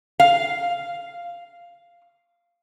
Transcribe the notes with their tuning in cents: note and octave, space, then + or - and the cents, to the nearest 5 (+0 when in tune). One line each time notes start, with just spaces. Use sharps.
F5 -10